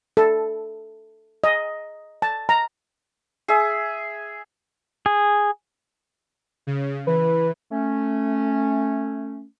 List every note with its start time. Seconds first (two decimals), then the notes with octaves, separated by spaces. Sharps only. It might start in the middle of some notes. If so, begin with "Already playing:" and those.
0.17 A4
1.44 D#5
2.22 A5
2.49 A#5
3.48 G#4 E5
5.06 G#4
6.67 C#3
7.07 E3 B4
7.71 A3 C#4